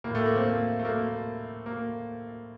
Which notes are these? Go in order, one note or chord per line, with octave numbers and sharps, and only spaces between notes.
A2 A#3
A3
A#3
C4
A#3
A3
A#3
A#3